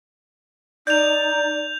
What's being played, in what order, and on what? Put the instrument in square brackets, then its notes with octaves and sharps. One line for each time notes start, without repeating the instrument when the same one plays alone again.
[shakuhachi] D#4 [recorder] D5 [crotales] G6 F7